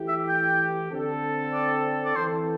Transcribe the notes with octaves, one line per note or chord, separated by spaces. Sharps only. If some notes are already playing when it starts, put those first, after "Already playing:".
Already playing: E3 A3 E4 G4
E5
G5
D3 C4 A4
D5
D5
E3 C4 A4 C5